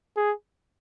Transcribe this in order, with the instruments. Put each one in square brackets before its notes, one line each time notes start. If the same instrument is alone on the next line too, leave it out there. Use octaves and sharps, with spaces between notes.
[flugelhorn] G#4